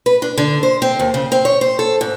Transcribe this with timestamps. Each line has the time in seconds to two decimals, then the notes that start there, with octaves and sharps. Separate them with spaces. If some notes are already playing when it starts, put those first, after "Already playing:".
0.06 B4
0.22 D4
0.38 D3
0.63 C5
0.82 C4
0.99 D#2
1.14 C#3
1.32 C4
1.45 C#5
1.61 C5
1.79 A4
2.01 G#2